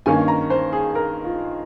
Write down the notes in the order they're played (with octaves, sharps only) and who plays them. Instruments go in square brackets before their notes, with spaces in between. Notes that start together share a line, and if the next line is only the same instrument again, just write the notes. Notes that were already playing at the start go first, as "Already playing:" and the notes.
[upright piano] G2 D#3 A#3 C#4 G#5
A#5
C5
G#4
A#4
F4